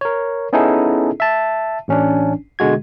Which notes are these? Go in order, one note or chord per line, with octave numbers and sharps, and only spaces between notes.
A#4 C#5
B3 C#4 D#4 E4 G#4 A4
E5 A5
A1 C#4 D4
B2 D3 G#3 F#4 G#6